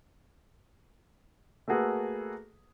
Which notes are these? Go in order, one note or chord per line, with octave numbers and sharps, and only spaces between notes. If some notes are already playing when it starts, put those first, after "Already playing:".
A3 A#3 F#4 G#4 A4 B4